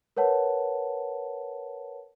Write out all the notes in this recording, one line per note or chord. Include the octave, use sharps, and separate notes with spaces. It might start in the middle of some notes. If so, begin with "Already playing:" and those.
A#4 B4 C#5 F#5 A5